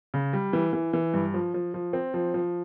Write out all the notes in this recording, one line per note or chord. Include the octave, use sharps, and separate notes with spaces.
C#3
G3
E3
E3
E3
G2
F3
F3
F3
C4
F3
F3